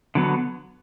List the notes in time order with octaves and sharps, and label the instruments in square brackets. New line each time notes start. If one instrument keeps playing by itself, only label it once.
[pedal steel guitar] D3 F#3 B3